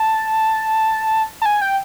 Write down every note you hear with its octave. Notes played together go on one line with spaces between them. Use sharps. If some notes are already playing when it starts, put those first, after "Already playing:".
Already playing: A5
A5
G#5
G5